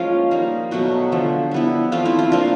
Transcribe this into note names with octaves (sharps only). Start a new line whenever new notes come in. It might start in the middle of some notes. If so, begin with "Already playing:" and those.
Already playing: F3 G#3 A#3 C#4 F4
G3 A#3 D#4
B2 F#3 A3 F#4
D3 F3 A3
G3 B3 E4
F3 A3 C4 F4
E4
F4
F3 A#3 D4 F4